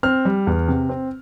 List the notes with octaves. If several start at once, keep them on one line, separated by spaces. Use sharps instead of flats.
C4 F6
G3
E2
C3
C4